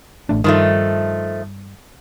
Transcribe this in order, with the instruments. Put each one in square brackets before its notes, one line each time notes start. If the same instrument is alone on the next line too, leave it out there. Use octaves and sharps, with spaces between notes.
[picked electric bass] A1 A3 D4
[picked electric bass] G2 [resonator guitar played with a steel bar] D#3 F3 A3